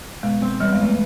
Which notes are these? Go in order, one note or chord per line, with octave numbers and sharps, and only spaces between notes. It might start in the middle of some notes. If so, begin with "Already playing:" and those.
B2 G#3
C4
E2 G3
G#3
E3 A3
G#3